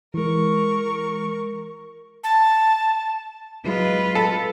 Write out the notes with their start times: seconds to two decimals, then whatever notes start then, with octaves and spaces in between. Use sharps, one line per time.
0.14 E3 G#3 A#4 C#6
2.24 A5
3.66 F#3 G#3 F4 B4
4.15 A4